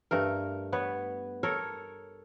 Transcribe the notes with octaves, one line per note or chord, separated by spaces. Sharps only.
G2 A3 A#4
B3 B4 C#5
A4 A#4 C#5